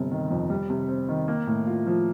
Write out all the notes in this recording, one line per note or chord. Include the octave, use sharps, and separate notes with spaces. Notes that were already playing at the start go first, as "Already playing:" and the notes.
Already playing: G1 C3
D#3
F2
G3
C3
C4
D#3
A#3
A2
F4
F3